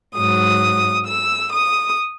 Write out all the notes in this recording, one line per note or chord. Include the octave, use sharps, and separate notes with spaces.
G#2 F#3 D#6
E6
D#6